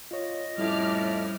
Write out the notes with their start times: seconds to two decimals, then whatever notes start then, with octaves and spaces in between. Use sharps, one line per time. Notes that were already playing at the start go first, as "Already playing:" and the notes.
0.11 F4 C#5 D#5
0.58 F2 A2 G3 C#4 E4 E5 D6 F6